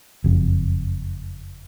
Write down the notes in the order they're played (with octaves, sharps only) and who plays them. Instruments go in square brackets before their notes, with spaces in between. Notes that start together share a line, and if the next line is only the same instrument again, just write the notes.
[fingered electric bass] F#1 F2